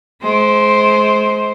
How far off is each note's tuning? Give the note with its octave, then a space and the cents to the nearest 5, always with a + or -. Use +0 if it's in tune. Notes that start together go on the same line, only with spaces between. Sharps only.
G#3 +35 C5 +0